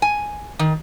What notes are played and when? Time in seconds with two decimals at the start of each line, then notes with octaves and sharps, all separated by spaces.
0.02 G#5
0.59 D#3